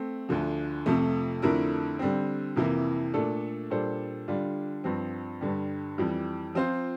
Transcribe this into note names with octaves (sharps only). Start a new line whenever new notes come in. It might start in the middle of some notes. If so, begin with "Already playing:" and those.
Already playing: A3 C4
D2 D3 F3
F2 C3 F3 A3
F2 D3 A3 E4 A#4
D3 G3 C4
F2 C3 E3 A#3 E4
A#2 A3 D4 A4
A#2 G3 D4 A4 C5
D3 G3 D4 F4
G2 F3 C4
G2 D3 G3
F2 E3 G3
F3 C4 F4 C5